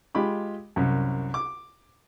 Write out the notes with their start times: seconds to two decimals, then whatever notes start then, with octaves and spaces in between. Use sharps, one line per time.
0.15 G#3 F4 G4 B5 D6
0.76 C2 F#2
1.34 D6